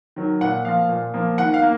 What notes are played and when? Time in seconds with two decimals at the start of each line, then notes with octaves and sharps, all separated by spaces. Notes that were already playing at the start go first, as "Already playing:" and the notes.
0.16 D#3 F#3
0.41 A#2 F#5
0.65 F3 A#3 F4 F5
0.89 A#2
1.14 F3 A#3 F4
1.38 D#3 F#5
1.54 F5
1.62 A#3